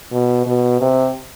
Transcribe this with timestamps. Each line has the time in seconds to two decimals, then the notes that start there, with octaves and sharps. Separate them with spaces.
0.12 B2
0.46 B2
0.81 C3